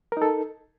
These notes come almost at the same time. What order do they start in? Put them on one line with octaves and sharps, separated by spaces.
A#4 D#4 A4